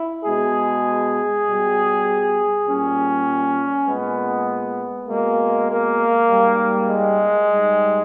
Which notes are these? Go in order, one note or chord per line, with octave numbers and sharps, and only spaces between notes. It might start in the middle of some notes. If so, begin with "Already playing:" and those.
Already playing: E4
B2 G#3 G#4
B2 G3
A#2 G3 C#4
A#2 G#3 B3
B2 G#3 A#3
A#3
G#2 G3
G#3
G#2 G3